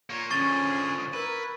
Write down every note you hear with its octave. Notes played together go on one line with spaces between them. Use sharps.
A#3 F4 C#5
D3 F3 C#4 G#4 C#6 A6 G7
E4 A#4 B4